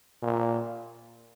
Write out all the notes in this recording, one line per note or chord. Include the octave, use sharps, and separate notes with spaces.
A#2